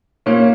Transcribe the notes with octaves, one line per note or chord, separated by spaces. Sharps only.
A#2 A#3 C#4